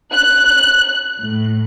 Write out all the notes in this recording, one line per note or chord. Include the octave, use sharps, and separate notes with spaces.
F#6
A2